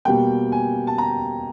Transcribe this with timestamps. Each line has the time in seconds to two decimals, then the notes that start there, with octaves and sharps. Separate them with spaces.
0.05 B2 G3 A#3 G5
0.52 G#5
0.87 A5
0.98 A#5